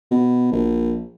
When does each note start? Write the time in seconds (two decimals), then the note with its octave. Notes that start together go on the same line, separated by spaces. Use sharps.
0.11 B2
0.52 A#1